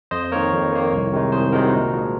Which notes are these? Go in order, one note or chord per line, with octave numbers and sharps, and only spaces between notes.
F2 C5 D#5
D#3 A#3 A#4 C#5
F2
D#3 A#3
C2
C3 D#3 G#3 D#4
C2 G#4 C5
C3 D#3 G#3 D#4 F#4 A#4
A#2
F3 G#3